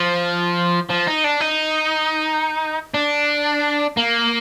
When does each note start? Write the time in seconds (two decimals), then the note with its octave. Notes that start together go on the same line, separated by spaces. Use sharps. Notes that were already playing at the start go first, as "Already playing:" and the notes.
Already playing: F3
0.89 F3
1.07 D#4
1.24 D4
1.41 D#4
2.94 D4
3.97 A#3